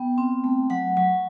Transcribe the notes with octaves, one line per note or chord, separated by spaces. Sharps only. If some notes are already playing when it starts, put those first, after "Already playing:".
Already playing: B3 G5
C4
A3
F#3 F#5
F#3